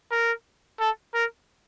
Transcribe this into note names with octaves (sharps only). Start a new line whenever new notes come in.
A#4
A4
A#4